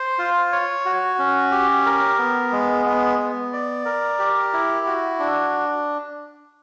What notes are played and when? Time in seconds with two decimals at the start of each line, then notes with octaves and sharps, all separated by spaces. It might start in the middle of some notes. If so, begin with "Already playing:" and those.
Already playing: C5
0.18 F4
0.52 C#5
0.86 F#4
1.19 C#4
1.51 G4
1.86 A#4
2.18 B3
2.52 G#3
2.86 B3
3.19 B3
3.53 D5
3.85 A#4
4.19 G4
4.53 E4
4.87 F#4
5.19 D4